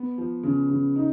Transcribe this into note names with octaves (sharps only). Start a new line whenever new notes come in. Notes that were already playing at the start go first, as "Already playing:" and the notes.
Already playing: B3
F3
C#3
C#3
D#4